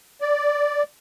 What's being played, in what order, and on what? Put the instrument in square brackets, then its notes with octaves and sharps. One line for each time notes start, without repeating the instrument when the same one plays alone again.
[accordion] D5